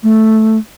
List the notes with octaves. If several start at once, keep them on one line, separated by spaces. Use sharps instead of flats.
A3